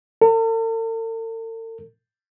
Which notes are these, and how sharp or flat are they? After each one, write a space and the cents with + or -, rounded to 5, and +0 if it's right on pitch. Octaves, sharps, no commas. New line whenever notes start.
A4 +45